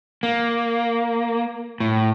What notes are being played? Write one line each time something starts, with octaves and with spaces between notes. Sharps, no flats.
A#3
A2